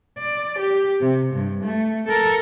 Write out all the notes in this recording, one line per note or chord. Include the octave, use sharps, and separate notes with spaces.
D5
G4
C3
G2
A3
A4 A#4